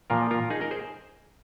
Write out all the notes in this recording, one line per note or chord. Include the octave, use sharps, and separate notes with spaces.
A#2 F3 F4 A#4
F4 A#4
D#4 G#4
A#4 D#5
G#4 C5